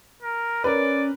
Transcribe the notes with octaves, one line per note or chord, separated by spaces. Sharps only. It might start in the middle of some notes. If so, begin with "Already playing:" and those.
A#4
C#4 A#4 B4 D5